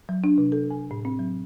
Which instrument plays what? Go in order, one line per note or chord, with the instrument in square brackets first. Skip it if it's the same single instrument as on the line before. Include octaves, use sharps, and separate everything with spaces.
[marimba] F#3
D4
C3
A4
G#5
A2
C4
F#3